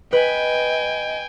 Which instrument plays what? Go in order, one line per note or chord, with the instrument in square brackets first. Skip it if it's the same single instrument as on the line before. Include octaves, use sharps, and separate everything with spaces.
[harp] B4 [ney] D#5 [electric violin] G5 G#5